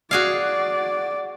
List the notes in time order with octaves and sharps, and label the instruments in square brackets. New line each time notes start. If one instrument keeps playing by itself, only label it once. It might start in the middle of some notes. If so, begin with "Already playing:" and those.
[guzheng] F#4 G#4 F5 [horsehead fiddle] D5